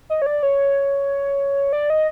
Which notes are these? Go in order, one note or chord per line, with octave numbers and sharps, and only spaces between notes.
D#5
C#5
D5
C#5
D5
D#5